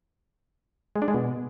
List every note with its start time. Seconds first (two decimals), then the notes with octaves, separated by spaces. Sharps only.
0.96 G#3
1.02 D4
1.08 G#3
1.14 B2